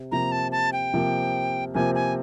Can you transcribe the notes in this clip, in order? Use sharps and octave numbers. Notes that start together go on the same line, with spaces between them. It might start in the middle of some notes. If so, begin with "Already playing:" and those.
Already playing: C3
C3 F3 A#3 A#5
A5
A5
G5
C3 F3 A#3
C3 F3 A#3 G#5
G#5